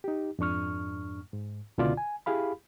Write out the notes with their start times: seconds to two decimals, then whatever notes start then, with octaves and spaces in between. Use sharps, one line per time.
0.04 D#4 G4
0.39 F2 G#2 D4 C#6 F6
1.33 G#2
1.78 C#2 B2 D3 E4 F4 D5
1.97 G#5
2.26 E4 G4 G#4 F5 B5